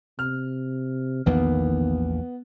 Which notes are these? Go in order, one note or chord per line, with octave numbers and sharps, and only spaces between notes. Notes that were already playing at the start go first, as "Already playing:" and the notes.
C3 F6
A#1 E2 D#3 A#3 B3